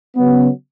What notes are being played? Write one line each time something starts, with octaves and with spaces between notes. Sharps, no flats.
C#3 F#3 B3